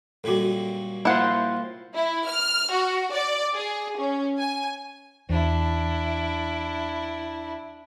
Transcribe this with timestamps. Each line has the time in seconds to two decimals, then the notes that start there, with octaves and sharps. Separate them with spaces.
0.24 F#2 A#2 G3 F#4 A4
1.05 A#3 E4 F4 C5 F#5
1.94 E4
2.29 F6
2.71 F#4
3.11 D5
3.54 G#4
3.97 C#4
4.39 G#5
5.29 E2 D4 E4